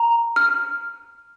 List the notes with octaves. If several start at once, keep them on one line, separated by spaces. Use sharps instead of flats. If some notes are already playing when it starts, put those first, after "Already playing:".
Already playing: A#5
F6